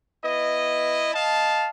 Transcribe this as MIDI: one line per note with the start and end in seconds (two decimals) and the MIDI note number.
0.24 1.09 59
0.24 1.09 64
0.24 1.09 75
1.14 1.68 75
1.14 1.68 77
1.14 1.68 81